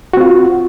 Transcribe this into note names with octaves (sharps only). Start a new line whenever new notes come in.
C4 F4 F#4